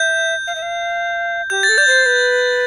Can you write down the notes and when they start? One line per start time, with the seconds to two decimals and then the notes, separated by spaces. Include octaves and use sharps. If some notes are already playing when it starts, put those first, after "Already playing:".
Already playing: E5 G6
0.47 F5
0.56 E5
0.62 F5
1.50 G4 G6
1.63 A6
1.69 A4
1.78 D5 G6
1.87 C5
2.06 B4